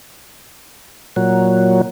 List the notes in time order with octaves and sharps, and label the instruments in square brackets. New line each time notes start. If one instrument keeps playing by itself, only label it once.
[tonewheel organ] A#2 F#3